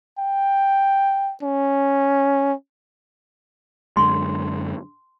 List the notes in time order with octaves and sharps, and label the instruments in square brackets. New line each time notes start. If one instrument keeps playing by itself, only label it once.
[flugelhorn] G5
C#4
[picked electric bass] F#2 D3 G#3 [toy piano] C6